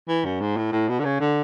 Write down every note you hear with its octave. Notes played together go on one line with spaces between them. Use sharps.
E3
F#2
G#2
A2
A2
B2
D3
C#3
D3